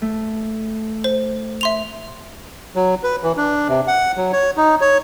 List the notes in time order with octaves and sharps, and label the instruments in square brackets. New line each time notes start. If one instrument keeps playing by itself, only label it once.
[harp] A3
[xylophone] C5
E5 C6 F7
[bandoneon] F#3
B4
E3
D4
C3
F#5
F#3
C#5
D#4
C#5